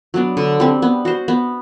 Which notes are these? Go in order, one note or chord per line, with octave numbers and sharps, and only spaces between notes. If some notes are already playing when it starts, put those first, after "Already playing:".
F#3 B3 D4
D3
G3 C4
B3
F#4 C5
B3